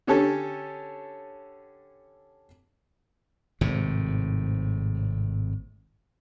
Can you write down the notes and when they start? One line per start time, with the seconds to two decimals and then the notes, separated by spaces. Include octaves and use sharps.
0.07 D3 C#4 G4 A4 C#5
3.61 G#1 A2 C3